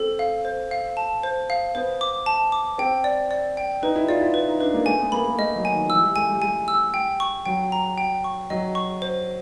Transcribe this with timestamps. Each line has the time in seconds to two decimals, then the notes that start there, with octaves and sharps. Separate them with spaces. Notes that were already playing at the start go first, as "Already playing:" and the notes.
Already playing: C4 A4
0.19 F5
0.45 C5
0.71 F5
0.97 A5
1.23 C5
1.50 F5
1.75 B3 C5
2.01 D6
2.26 A5
2.52 D6
2.78 C4 G5
3.04 D5
3.31 D5
3.57 G5
3.82 D#4 B4
3.96 E4
4.09 F4 D5
4.21 E4
4.34 B4
4.48 D#4
4.61 D4 B4
4.74 A#3
4.86 A3 G#5
4.99 B3
5.12 A#3 B5
5.26 A#3
5.38 A3 D#5
5.56 F#3
5.65 G#5
5.73 D#3
5.85 F3
5.90 E3 E6
6.03 G3
6.16 A3 G#5
6.29 G3
6.42 G3 G#5
6.68 E6
6.94 G5
7.20 C#6
7.46 F#3 G5
7.72 A#5
7.98 G5
8.24 C#6
8.50 F#3 D#5
8.75 C#6
9.02 C5